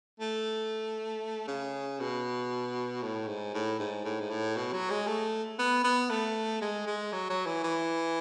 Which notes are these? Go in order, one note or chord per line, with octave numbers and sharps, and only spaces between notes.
A3
C#3
B2
A2
G#2
A2
G#2
A2
G#2
A2
B2
F#3
G#3
A3
B3
B3
A3
G#3
G#3
F#3
F#3
E3
E3